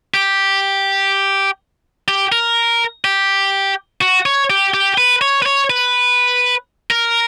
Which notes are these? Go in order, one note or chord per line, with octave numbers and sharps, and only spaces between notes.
G4
G4
A#4
G4
F#4
C#5
G4
G4
B4
C#5
B4
C#5
B4
A#4